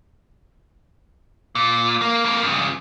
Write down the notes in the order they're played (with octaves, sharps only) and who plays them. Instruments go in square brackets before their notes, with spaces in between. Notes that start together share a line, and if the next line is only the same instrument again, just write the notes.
[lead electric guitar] A#2
A#3
F2 A#3
G2 C#3